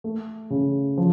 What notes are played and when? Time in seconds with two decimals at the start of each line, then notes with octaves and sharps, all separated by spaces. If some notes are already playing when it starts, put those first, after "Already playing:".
0.04 A3
0.50 C#3
0.97 F3